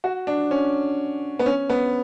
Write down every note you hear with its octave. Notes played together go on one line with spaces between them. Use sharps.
F#4
D4
C#4
B3
C#4
B3